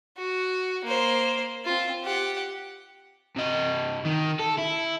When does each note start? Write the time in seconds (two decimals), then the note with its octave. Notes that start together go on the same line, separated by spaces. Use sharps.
0.18 F#4
0.84 A#3 C5
1.65 C4 F4
2.03 G4 F#5
3.36 C3 D#5
4.05 D#3
4.40 A4
4.58 E4